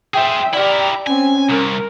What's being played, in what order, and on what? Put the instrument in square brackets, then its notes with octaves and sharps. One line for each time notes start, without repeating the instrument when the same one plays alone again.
[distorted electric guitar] G#4 C5 [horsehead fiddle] E5 G5
[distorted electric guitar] E4 A#4 [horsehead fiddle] G4 [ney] D5
[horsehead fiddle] C4 [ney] C#4 [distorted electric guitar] G#5
[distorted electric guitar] C2 [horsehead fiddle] A#4